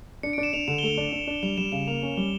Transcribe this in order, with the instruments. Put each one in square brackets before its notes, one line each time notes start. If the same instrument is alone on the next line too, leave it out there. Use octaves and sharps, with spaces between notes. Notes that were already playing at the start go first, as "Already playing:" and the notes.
[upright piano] D4 [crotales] C#7
[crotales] D7
[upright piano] D4
[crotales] E7
[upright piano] D4 [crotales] F7
[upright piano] D3 [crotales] E7
[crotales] G7
[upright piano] A3 [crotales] F7
[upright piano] D4
D4
D4
[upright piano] G3 [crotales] F7
[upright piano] G3 [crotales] E7
[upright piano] C#3 [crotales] E7
[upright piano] A#3 [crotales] F7
[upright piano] C#4 [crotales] F7
[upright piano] G3 [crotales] G7